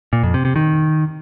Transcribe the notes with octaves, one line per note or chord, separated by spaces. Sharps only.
A#2
F2
C3
C3
D#3